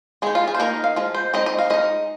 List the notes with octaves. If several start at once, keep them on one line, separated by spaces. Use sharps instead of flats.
G#3 D#4 G#4
F4
G#4
C5
D#3 A#3 D#4 A#4
F5
F3 G#3
C5
G#3 C4 D#4 D#5
D#5
F5
G#3 D#4 D#5